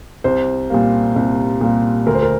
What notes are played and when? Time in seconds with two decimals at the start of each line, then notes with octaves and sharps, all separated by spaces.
0.24 C2 C5
0.70 A#2 G3 A#3
1.16 C2
1.61 A#2 G3 A#3
2.07 D2 A#4
2.15 C5
2.23 A#4